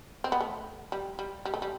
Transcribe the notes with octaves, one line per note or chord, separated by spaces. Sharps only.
C4
B3
A3
G3
G3
G3
A3
G3